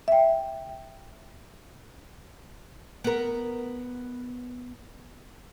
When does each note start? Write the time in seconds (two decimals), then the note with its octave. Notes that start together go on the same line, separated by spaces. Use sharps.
0.08 E5 G5
3.04 B3 A#4